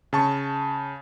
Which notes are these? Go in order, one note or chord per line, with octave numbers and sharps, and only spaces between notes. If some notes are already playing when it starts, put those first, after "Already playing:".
C#3 A5 C#6